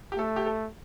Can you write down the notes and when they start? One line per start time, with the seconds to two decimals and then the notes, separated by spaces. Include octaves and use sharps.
0.12 G4
0.18 A3 A4
0.36 G4
0.46 A4